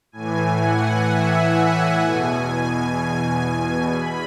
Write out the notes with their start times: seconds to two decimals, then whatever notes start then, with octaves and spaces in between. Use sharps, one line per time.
0.12 A2 E3 G#5
0.60 F#5
1.08 E5
1.56 F#5
2.03 E2 B2 G#5
2.50 G#5
3.93 E2 B5